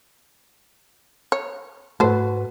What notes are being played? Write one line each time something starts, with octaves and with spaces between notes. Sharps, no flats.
C#5
G#2 A3 F#4 A4 B4 C5